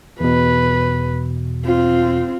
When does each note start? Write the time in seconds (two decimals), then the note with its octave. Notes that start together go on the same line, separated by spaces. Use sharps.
0.20 E2 B2 B4
1.65 C4 F4